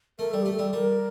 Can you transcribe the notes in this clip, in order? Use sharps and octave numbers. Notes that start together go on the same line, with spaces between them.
A3 A#4
G3 A4
A3 G4
A4
G3
G3 A#4